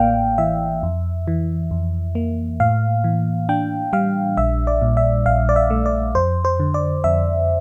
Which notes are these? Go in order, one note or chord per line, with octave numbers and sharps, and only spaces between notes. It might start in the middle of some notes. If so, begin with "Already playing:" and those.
Already playing: A1 A2 A#3 D5 F5 G5
E3 E5
F2
E3
F2
A#3
A2 F5
E3
D4 G5
G3 F5
A#1 E5
D5
A#2
E5
A#1 F5
D5
E5
A3
D5
F2 C5
C5
D3
D5
F2 E5